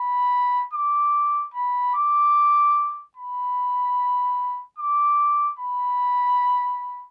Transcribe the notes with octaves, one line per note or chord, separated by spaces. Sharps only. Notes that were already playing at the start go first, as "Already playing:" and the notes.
Already playing: B5
D6
B5
D6
B5
D6
B5